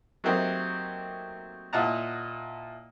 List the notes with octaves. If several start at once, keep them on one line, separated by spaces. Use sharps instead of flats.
F#3 A3 A#3 C4 D#4 G4
A#2 E4 D#5 F#5 A5 A#5